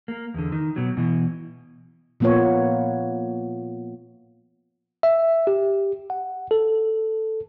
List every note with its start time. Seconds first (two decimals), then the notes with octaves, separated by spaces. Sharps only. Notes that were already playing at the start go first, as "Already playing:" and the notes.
0.08 A#3
0.34 E2 D3
0.52 D#3
0.76 B2 F#3
0.97 B2 E3
2.20 A#2 F3 A#3 B3 F4 C#5
5.03 E5
5.47 G4
6.10 F#5
6.51 A4